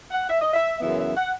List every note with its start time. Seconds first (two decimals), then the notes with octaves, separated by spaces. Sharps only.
0.11 F#5
0.29 E5
0.41 D#5
0.53 E5
0.81 F#2 C#3 E3 B3 E5
0.99 E5
1.16 F#5